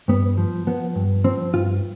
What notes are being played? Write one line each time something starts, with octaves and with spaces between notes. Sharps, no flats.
G2 B3
F3
F3 B3
G2
F3 C4
G2 F4